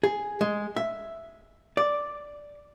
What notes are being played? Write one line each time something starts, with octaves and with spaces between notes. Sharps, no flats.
G#4
G#3
E5
D5